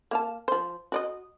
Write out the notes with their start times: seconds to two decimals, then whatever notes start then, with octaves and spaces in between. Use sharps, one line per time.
0.11 A#3 F5 A5
0.48 F3 C5
0.92 F#4 D5 D#5